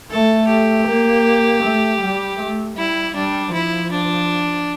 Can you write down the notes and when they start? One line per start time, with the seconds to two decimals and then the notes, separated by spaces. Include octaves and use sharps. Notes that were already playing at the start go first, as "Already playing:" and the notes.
0.11 A3 A4
0.49 G4
0.87 A#3
1.63 A3
2.01 G3
2.39 A3
2.77 G3 E4
3.15 G3 D4
3.53 F3 E4
3.91 D4